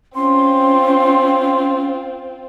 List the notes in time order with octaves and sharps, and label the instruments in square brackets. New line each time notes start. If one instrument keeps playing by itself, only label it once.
[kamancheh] C4 F4 [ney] C#4 [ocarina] C6